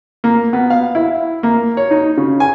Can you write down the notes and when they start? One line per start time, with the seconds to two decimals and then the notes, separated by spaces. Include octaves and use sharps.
0.24 A#3
0.53 B3
0.70 F5
0.95 E4
1.43 A#3
1.77 C#5
1.91 D#4
2.17 C#3
2.40 G#5